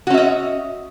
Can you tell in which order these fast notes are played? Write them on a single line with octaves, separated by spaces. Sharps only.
F#4 C#4 E5 D#5